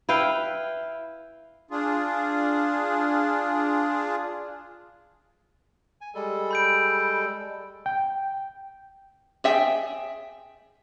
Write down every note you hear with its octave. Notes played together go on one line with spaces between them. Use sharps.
E4 B4 F5 G5
D4 F4 G#4
G#5
G3 G#3 A4
B5 G6 D7
G5
G#4 E5 G5